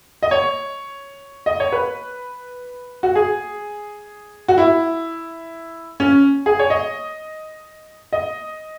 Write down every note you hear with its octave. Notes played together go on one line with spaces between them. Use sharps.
D#5
C#5
D#5
C#5
B4
F#4
G#4
F#4
E4
C#4
G#4
C#5
D#5
D#5